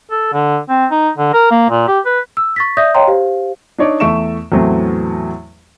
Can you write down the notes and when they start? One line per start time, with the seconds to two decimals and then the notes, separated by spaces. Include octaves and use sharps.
0.11 A4
0.33 D3
0.70 C4
0.91 D#4
1.18 D3
1.34 A#4
1.51 A#3
1.70 A#2
1.88 G4
2.06 B4
2.37 E6
2.56 C#6 A6 B6
2.77 D5 E5 D#6 G6 A#6
2.94 C#5 D#5 F5 G5 A#5 C6
3.08 G4 C5 F5
3.78 D4 D#4 C#5 D5
4.00 E2 A3 E5 C#6 D7 E7
4.52 E2 A2 E3 F#3 A3 C4